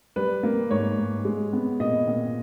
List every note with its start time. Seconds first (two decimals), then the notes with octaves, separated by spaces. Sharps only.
0.16 G3 B4
0.43 A#3
0.70 G#2 C#5
0.98 G#2
1.25 G#3
1.53 B3
1.80 A#2 D#5
2.07 A#2